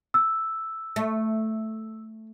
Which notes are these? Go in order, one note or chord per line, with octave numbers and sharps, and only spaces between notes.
E6
A3